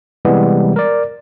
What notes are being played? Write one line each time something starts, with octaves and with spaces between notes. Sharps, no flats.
C3 E3 G3 G#3 B3
A#4 D5